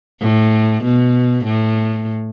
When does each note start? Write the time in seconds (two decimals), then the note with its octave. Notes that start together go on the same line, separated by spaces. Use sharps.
0.21 A2
0.84 B2
1.45 A2